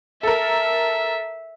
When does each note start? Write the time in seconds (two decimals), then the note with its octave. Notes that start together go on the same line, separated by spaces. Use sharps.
0.23 A4 A#4 E5